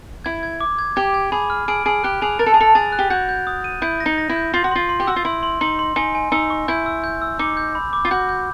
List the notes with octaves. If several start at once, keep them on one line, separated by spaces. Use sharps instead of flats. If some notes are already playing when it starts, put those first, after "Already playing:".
E4 G#6
G#6
D6
G#6
G4 G#6
G#6
G#4 B5
F6
G#4 D7
G#4 D7
G4 F#6
G#4 F7
A#4 A6
A4
G#4
A4 F7
G#4 A6
F#6
G4
F#4 G6
G6
D#6
D#7
E4 G6
A#6
D#4
A#6
E4
G6
F4 C6
F#4
F4 C6
C6
G4
F#4 E6
F4
E4 C6
C6
D#4 C6
C6
D#4 G#5
G#5
D#4 E6
C#6
E4 G6
E6
G6
E6
D#4 D6
G6
B5
D6
F4
F#4 G6
G6